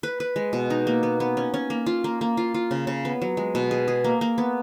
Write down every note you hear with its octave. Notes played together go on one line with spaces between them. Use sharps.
B4
B4
G#3
B2
D#4
A#3
B3
B3
C#4
C#4
A#3
F4
A#3
A#3
F4
F4
C#3
C#3
B3
F#3
G#3
B2
G#4
G#4
A#3
A#3
B3